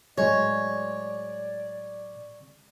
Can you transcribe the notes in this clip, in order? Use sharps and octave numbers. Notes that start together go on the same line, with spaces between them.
A2 F#3 G#3 C#5 D5